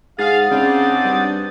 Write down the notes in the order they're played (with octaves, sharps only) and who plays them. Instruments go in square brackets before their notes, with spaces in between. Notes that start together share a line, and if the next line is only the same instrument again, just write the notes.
[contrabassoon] G#2 [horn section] G#4 F5 [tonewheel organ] F#5 D#6 A6
[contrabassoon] C#3 [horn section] C4 D4 D#4
[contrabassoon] G2